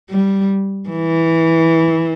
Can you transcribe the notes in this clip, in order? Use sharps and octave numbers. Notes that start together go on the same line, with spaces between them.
G3
E3